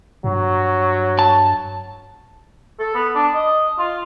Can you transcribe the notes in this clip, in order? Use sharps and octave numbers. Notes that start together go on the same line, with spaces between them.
G2 F#3
A5
A4
B3
D4
D#5
F4